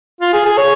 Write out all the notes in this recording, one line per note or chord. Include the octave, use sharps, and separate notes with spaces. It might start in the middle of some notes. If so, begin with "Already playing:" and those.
F4
G#4
G#4
C#5